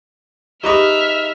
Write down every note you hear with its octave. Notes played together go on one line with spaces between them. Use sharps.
D#4 G4 G#4 B4 E5 A#5 D#6 F6